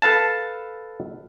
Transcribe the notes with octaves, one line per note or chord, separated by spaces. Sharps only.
A4 B4 F5 A5